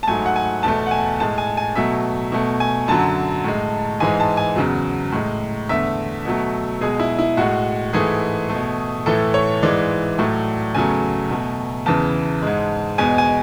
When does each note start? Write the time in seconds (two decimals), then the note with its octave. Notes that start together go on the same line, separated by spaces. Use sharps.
0.03 A5
0.07 G#2 F#3 A3 G#5
0.26 F#5
0.36 G#5
0.63 E2 B2 A3 A5
0.87 F#5
0.91 G#5
1.20 A2 G#3 A5
1.38 G#5
1.57 G#5
1.75 B2 F#3 A3 E5
2.32 B2 A3
2.60 G#5
2.88 F#2 D3 F#3 A5
3.44 A2 G#3
4.00 G#2 E3 G#3 G#5
4.20 A5
4.37 G#5
4.56 E2 C#3 F#3
5.12 A2 G#3
5.69 E2 D3 A3 E5
6.25 B2 F#3 A3
6.81 B2 G#3 G#4
7.00 E4
7.19 E4
7.37 A2 G#3 F#4
7.93 G#2 E3 A3 G#4
8.49 A3
8.54 B2
9.06 A2 E3 A3 A4
9.34 C#5
9.62 G#2 E3 G#3 D5
10.18 A2 F#3 A3
10.75 E2 C#3 F#3 A3 G#5
11.31 B2 A3
11.86 E2 C#3 E3 A5
12.42 G#2 G#3
12.98 E2 B2 G#3 G#5
13.18 G#5